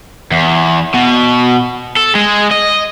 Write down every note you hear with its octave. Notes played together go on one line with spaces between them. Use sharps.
E2
B2
A4
G#3
D#5